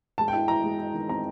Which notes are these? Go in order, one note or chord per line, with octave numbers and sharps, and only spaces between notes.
G#3 A5
G5
E4
E4 A#5
G#3
E4
D#3
C4 A#5